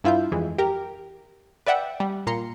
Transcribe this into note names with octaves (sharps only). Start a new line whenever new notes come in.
G2 E4 F4 E5 G6
F2 E3 G#3
G4 A#4
B4 D5 E5 F#5 G5
G3
A#2 A#5 C6 C#7